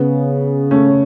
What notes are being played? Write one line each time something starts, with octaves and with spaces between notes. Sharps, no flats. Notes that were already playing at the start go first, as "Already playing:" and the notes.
Already playing: C#3 B3
A3 C#4